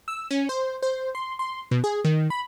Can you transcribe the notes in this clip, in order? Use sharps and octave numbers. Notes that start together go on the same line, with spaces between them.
E6
C#4
C5
C5
C6
C6
B2
G#4
D#3
B5